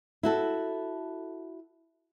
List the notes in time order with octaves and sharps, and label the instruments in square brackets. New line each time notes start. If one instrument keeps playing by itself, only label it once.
[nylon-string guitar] E4 F#4 A4